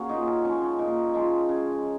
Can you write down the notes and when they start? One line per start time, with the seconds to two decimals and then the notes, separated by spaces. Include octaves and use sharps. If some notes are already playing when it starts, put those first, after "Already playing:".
Already playing: A#3 C#4 F#4 G#4
0.09 A#2 D#4
0.27 C#4
0.44 F3 G#3 C#4
0.62 C#4
0.79 A#2 D#4
1.14 F3 G#3
1.49 C#3